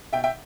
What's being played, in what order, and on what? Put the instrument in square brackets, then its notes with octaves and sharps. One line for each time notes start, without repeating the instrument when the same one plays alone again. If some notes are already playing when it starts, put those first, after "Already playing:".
[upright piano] B2 E5 G5
E5 G5